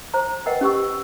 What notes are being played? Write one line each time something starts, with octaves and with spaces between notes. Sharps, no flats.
C5 A#5
A#4 B4 D#5 F#5 G5
C#4 G4 C#6 E6